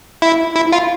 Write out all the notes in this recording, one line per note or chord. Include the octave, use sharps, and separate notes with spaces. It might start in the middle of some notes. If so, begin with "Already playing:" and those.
E4
E4
F4